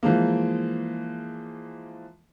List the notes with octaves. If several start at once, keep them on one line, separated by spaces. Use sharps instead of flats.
E3 F3 G#3 A#3